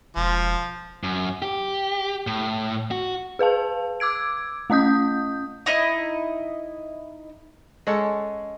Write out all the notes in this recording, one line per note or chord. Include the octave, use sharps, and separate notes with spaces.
E1 F3
F#2
G4
A2
F#4
G#4 B4 F5 A5
D6 E6 G#6 D7
A3 C#4 D#5 D#6 G6
D#4 E4 D#5
G#3 C#4 A4 F#5